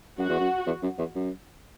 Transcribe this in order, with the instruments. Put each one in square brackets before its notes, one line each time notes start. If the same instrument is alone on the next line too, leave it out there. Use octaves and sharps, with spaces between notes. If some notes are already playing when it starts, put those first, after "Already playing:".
[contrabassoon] F#2 [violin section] F#4
[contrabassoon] E2
F#2
E2
F#2
E2
F#2